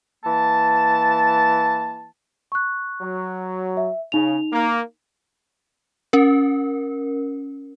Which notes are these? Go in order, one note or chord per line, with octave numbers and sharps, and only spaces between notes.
E3 A#3 A5
C#6 F#6
F#3
E5
C#3 D#4 F7
A#3
C#4 A#4